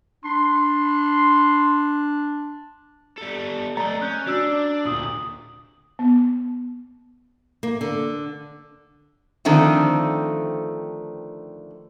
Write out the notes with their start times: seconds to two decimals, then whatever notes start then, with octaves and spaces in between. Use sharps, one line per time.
0.24 D4 C6
3.18 G3 A4
3.77 A3 D5 D#5 A#5 A6
4.02 C#4 F#6 G6
4.27 D4 F#4 D5 E6
4.85 D2 A#2 D#6 F#7
5.99 B3
7.63 A#3
7.81 D3
9.45 D3 D#3 F3 A3 C4